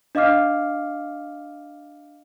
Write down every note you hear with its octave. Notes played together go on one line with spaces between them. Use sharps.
D4 D#5 F5 D6 F6 C7